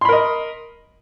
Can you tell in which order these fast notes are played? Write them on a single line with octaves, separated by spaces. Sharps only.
C6 B5 A#4 D#5